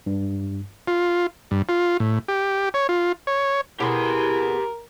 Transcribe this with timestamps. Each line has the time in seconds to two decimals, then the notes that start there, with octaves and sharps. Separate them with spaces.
0.06 G2
0.87 F4
1.51 G2
1.69 F4
2.00 A2
2.28 G4
2.74 C#5
2.89 F4
3.27 C#5
3.80 B2 E4 G4 G#4 A#4 B4 C6